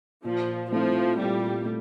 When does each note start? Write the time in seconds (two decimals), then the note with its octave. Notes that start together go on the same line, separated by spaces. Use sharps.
0.24 A#2 F3
0.71 F3 A3 C4 E4
1.19 A#2 G3
1.65 A3